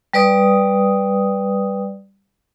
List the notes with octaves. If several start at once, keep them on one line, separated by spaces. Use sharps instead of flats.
G3 B4 D5 D#6